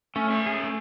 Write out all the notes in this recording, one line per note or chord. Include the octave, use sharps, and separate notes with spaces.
A3 C#4
C#4 E5
G#4
A3